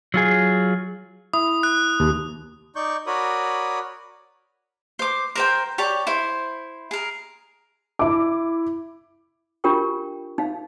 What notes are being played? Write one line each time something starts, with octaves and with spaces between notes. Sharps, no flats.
F#3 F4 G#4
E4 D#6
F#6
D#2
D#4 D5 C#6 G6
F#4 A#4 C#5 D5 B5 D#6
C5 D6
A#4 C5 G5
G4 C#5 D5 A5
E4 C5
G#4 A#4
E4 D6
D4 F4 G4 A#4 G5 C#6
D#4 F5